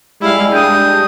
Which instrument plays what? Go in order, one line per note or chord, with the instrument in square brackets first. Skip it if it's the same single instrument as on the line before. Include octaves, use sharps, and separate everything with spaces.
[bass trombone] G3 [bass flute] G#3 [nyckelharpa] E4 F5
[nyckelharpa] G#3 D#6 [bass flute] D4 [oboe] G5